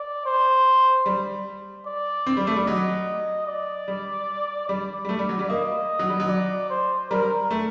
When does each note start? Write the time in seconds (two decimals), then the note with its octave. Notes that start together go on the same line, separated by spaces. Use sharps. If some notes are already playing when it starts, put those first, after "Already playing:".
Already playing: D5
0.26 C5
1.06 G3
1.86 D5
2.26 C4
2.37 G3
2.47 A3
2.56 G3
2.67 F#3 D#5
3.47 D5
3.88 G3
4.68 G3 D5
5.05 G3
5.09 A3
5.19 G3
5.29 F#3
5.39 G3
5.49 A#3 D#5
5.99 F#3
6.09 G3
6.20 F#3
6.29 D5
6.70 C5
7.10 G3 A#4
7.51 A3